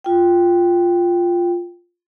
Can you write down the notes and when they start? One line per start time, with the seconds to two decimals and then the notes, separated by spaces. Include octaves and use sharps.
0.04 F4 G5